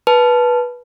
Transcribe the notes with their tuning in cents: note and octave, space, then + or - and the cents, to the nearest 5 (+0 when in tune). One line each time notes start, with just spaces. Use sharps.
B4 -15 A5 -10